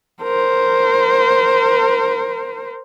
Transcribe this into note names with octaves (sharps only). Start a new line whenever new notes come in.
A#4 C5